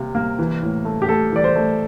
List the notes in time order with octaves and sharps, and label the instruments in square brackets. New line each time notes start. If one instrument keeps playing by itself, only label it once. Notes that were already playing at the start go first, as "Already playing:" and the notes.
Already playing: [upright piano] C3 A#3
A#3
E3
A2
A3
G4
A3 A4
E3 D5
C5
A3